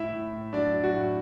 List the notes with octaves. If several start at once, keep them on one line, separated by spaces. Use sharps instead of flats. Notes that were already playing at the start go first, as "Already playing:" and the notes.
Already playing: A2 E4 E5
A2
A2
F#3 D4 D5
F#3
F#4
A2